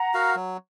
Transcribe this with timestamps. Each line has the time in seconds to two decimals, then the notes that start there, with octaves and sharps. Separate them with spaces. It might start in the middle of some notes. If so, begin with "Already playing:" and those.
Already playing: F#5 A#5
0.14 F#4 A#4 F5
0.36 F#3